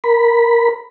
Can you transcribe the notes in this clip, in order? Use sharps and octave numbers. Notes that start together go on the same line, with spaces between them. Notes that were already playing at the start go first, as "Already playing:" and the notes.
A#4 B5